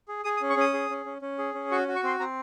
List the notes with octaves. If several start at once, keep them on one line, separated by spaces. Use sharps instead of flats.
G#4
G#4 D#6
D#6
C#4
C#6
C#4 D#6
G#4
C#4
C#4
C#4
G#4
C#4
F#4 C#6
F#4
C#6
C4 C6
C4 A#5